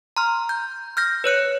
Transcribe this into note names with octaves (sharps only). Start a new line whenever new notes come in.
A#5 C6 F6
G6
F6 G6 A#6
B4 C#5 F#6 C#7